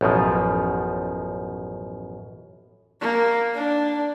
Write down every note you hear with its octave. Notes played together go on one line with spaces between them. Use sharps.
A1 F#2 B2 F3
A#3
D4